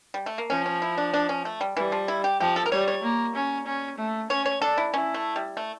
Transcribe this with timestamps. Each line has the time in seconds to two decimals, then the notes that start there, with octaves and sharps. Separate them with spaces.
0.14 G3
0.26 A3
0.38 A#3
0.50 F3 C#4
0.66 C#4
0.82 E4
0.98 D4
1.14 D4
1.29 C#4
1.45 A3
1.61 G3
1.77 E3 G3
1.92 F3
2.08 E4
2.24 G4
2.40 F3 G4
2.56 A4
2.66 A#4
2.72 G3 C#5
2.88 C#5
3.03 A#3
3.36 C#4
3.66 C#4
3.98 A3
4.30 C#4 C#5
4.45 C#5
4.62 D4 A4
4.78 E4
4.93 C#4 E4
5.14 A3
5.36 G3
5.57 A3